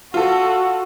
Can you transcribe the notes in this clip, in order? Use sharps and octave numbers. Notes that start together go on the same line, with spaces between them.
F4 F#4 A4